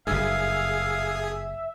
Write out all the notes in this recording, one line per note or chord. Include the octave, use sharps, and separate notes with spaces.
F#1 G2 G#4 E5 F5